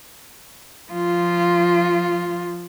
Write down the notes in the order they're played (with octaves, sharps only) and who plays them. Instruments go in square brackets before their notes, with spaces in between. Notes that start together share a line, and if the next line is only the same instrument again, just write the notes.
[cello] F3 F4